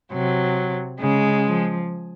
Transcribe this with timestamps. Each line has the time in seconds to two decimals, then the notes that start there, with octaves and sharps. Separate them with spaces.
0.13 C3 F#3
1.00 C#3 G#3
1.45 F3